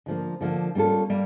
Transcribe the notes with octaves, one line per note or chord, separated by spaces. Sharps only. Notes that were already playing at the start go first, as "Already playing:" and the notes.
D3 F3 A#3
D3 F3 A#3
G3 A#3 C#4 F4 A4
G3 A#3